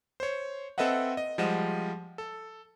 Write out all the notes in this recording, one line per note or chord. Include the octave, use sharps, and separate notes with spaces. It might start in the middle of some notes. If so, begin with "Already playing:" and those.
C5 C#5
C4 A4 B4 D#5 E5 F#5
D#5
F3 G3 G#3 D#5 F#5 E7
A4